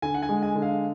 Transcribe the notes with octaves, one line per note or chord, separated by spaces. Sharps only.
D3 G#5
F#5
G#5
G#3
G#5
D3
F5